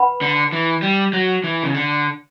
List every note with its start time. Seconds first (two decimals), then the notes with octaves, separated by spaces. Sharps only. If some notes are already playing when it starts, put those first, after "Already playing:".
Already playing: B4 F#5 B5
0.21 D3
0.52 E3
0.82 G3
1.13 F#3
1.44 E3
1.63 C#3
1.74 D3